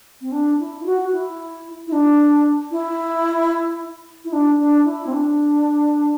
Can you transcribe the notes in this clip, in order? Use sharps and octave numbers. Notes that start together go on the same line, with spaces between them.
C4
D4
E4
E4
F#4
E4
E4
D4
E4
E4
D4
D4
E4
C4
D4